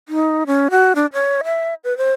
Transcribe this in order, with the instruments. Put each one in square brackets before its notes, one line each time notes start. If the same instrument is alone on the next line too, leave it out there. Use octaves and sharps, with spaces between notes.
[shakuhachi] D#4
C#4
F#4
D4
C#5
E5
B4
C5